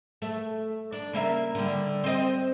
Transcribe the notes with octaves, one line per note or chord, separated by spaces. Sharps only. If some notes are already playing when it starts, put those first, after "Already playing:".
A3
D4
C#3 A#3 E5
D3 G3
C4 D#5